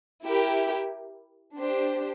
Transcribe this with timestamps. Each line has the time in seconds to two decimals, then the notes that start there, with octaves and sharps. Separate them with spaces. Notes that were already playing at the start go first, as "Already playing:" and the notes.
0.25 E4 G4 A#4
1.57 D4 G4 C5